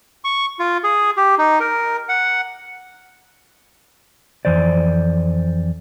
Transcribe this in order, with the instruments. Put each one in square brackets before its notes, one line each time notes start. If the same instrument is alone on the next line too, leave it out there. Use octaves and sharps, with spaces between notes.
[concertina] C#6
F4
G#4
G4
D#4
A#4
F#5
[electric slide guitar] F2 E3 C5 D5